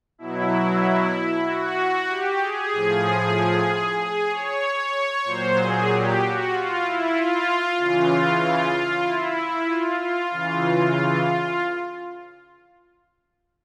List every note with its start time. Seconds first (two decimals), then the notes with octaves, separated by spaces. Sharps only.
0.18 B2 F#3 E4
1.45 F#4
2.08 G4
2.40 G#4
2.72 A2 F3
3.98 G#4
4.30 C#5
5.24 A#2 F#3 C5
5.56 G#4
5.88 G4
6.20 F#4
6.51 F4
6.82 E4
7.15 F4
7.77 C#3 E3 F4
9.04 E4
9.67 F4
9.99 F4
10.31 C#3 E3 F4